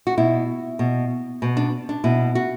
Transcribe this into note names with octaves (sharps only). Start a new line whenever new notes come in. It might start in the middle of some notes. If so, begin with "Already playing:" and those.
F#4
B2 E4
B2
B2
D4
D4
B2 E4
F#4